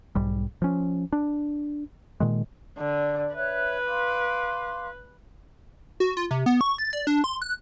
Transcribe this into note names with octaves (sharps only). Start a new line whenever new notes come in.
B1 G#2 G3
F3 C#4
D4
A#2 D#3 G#3
D3 D5
B4 C#5 E5 F#6
F5 C6 D6
F#4
F4
C3
B3
C#6
A6
D5
D4
C6
F#6